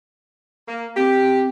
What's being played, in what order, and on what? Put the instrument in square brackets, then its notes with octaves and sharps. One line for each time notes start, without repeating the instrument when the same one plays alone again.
[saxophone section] A#3
[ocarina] C4 [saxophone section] G4